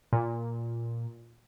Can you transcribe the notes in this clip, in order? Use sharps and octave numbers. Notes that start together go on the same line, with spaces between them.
A#2